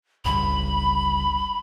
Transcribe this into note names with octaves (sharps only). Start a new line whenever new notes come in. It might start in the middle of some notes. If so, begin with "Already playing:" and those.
G1 C#2 G2 B5